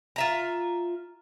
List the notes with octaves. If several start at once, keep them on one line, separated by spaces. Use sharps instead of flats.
F4 E5 A#5